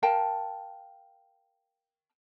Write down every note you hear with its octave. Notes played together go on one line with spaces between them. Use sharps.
A#4 F5 G5 A5